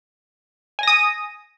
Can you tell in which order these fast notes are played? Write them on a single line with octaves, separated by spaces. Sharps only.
G#5 A#6 D#6